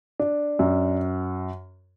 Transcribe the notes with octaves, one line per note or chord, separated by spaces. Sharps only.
D4
F#2